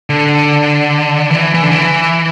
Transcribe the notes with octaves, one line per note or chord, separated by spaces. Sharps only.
D3
E3
E3
D3
E3